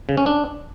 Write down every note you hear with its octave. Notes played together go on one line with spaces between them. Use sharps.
C#3
C#4
D4